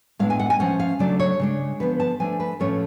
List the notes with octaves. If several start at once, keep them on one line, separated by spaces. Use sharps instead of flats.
A2 G#3 B3 D4 F5
G#5
F#5
G#5
F3 A3 C#4 F#5
F5
C#3 F#3 A3 D4 D5
C#5
C#3 G#3 D4
D3 F3 B3 B4
A5
F3 A3 D4 G#5
B4
A2 F3 A3 C#4 C#5